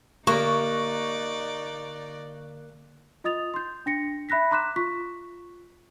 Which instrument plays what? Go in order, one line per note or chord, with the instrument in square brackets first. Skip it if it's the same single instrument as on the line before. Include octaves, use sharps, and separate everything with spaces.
[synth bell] D3 F#6 [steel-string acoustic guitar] A#3 [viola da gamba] D#4 D5 [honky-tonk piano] C#6
[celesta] F4 D#5 D#6 A6 F7
C6 G6
D4 A#6 C#7
E5 B5 F#6 A#6 B6
A#5 C6 D6 F#6 B6 E7
F4 C#6 B6